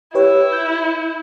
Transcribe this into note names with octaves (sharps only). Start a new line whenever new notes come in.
E4 G4 B4 C#5
G6